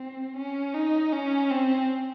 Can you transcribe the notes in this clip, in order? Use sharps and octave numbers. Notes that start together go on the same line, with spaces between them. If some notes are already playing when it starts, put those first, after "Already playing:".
Already playing: C4
C#4
D#4
C#4
C4